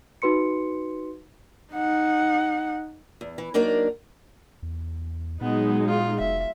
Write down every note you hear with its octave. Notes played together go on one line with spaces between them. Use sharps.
D#4 F#4 B4 C6 C#7
D#4 F#5
E2
E3
F#3 A#3 D4 D#4 A#4 D5
E2
A#2 F#3 G#3 B3 D#4
F4
F1 E5